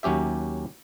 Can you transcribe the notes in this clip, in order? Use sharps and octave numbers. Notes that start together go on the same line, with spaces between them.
D#2 F#3 C#4 G4 E5